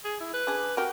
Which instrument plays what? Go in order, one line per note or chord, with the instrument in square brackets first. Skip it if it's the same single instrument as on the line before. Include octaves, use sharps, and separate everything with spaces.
[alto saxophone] G#4
E4
B4
[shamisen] D4 G#4
[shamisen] F#4 G4 [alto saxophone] A#4